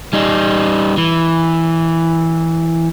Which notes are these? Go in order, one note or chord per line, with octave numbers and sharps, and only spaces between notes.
G3 D#4
E3